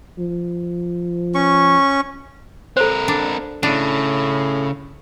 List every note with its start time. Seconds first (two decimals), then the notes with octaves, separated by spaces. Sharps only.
0.19 F3
1.35 C#4 C#6
2.77 C4 A4 A#4 C5
3.08 D4
3.63 A2 C#3 D4